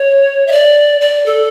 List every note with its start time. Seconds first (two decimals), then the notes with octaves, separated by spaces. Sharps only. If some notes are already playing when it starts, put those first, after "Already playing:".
Already playing: C#5
0.47 E5
0.52 D5
1.01 D5
1.26 A4